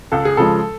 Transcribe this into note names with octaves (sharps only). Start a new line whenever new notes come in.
C#2 A4
G#4
C#3 F3 G#3 A4